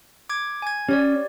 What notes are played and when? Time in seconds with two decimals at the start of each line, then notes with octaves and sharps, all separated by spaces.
0.29 D6 G#6
0.62 G#5 G#6
0.89 C#4 G4 C#5 D5